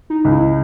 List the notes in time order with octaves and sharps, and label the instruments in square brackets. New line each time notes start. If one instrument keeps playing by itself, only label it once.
[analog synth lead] D#4
[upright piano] C#2
[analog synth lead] E4